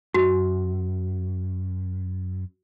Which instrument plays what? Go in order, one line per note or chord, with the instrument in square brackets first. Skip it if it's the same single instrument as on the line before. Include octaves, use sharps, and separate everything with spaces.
[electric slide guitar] F#2 [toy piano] F#4